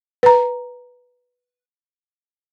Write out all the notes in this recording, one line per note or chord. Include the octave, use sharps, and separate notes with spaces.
B4 A#5